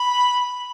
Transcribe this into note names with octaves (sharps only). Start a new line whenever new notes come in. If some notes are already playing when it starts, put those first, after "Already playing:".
Already playing: B5